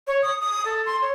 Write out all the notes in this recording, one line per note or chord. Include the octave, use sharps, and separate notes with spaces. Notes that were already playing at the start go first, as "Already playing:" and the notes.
C#5
D#6
D#6
A4
C6
C#5